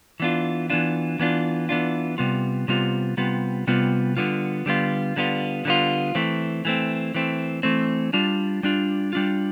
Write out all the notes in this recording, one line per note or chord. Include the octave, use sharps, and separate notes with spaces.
E3 B3 D4 F4
E3 B3 D4 F4
E3 B3 D4 F4
E3 B3 D4 F4
C3 G3 B3 F4
C3 G3 B3 F4
C3 G3 B3 F4
C3 G3 B3 F4
D3 G3 B3 F4
D3 G3 B3 F4
D3 G3 B3 F4
D3 G3 B3 F4
E3 A3 C4
E3 A3 C4
E3 A3 C4
E3 A3 C4
G3 D4 F4
G3 D4 F4
G3 D4 F4